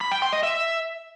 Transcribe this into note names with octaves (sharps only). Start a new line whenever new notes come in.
B5
G5
C6
D#5
E5